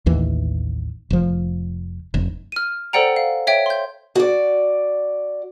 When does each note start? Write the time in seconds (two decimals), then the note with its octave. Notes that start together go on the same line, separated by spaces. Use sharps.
0.06 A1 D#2 E3
1.10 F1 F3
2.14 F1
2.52 F6 D#7
2.93 A4 C5 D5 F#5 G5 A#5
3.16 F5
3.47 C#5 E5 G5
3.66 C6 G6
4.15 F#4 D5